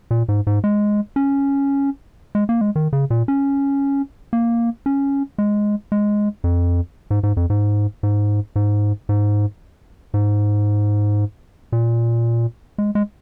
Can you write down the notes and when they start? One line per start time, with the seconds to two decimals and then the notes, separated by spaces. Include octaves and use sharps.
0.11 A#2
0.28 G#2
0.47 G#2
0.64 G#3
1.16 C#4
2.35 G#3
2.49 A#3
2.61 G#3
2.76 D#3
2.93 C#3
3.10 A#2
3.28 C#4
4.33 A#3
4.86 C#4
5.38 G#3
5.92 G#3
6.44 F2
7.11 G#2
7.23 G#2
7.37 F2
7.50 G#2
8.03 G#2
8.56 G#2
9.09 G#2
10.14 G#2
11.72 A#2
12.78 G#3
12.95 G#3